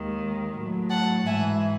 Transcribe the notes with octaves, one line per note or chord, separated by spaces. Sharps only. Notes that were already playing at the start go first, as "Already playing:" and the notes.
Already playing: D#2 D#3 G#3
A2 F#3
F#5 A5
G#2 E3 G#3 E5 G#5